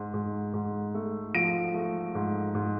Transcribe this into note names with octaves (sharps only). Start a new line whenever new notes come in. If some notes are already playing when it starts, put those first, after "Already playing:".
Already playing: G#2
G#2
G#2
A3
F3 D7
A3
G#2
G#2